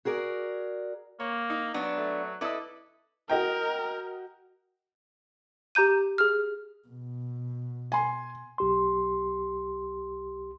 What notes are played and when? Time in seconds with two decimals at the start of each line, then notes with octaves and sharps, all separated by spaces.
0.05 F#4 G#4 A#4 D5
1.20 A#3 C#5
1.50 D#4
1.74 F#3 B3 D4
1.97 A3
2.41 E4 A4 B4 D5 D#5
3.30 F#4 A#4 D#5 G5
5.75 G4 A#5 G6 D#7
6.18 G#4 F6
6.88 B2
7.92 G#5 C6
8.58 B1 G4 C6